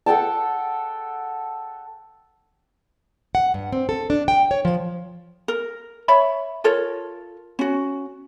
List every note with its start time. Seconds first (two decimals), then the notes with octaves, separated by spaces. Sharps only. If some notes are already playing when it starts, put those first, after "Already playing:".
0.06 A4 F#5 G5 A5
3.35 F#5
3.54 G2
3.72 C4
3.89 A4
4.10 D4
4.28 G5
4.51 C#5
4.65 F3
5.48 A#4
6.08 C#5 E5 B5
6.64 F4 A4 A#4 C#5
7.59 C#4 F#4